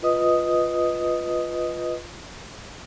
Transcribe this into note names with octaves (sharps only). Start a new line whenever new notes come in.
F4 B4 D#5 D#6